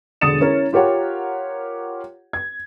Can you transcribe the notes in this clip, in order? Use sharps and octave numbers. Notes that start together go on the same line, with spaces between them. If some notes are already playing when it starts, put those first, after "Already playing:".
E1 D3 D#6 A6 C#7 E7
C#4 E4 A#4 C#5
F4 G4 A#4 C#5 F#5
G#6